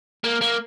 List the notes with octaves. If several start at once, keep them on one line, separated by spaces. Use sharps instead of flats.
A#3
A#3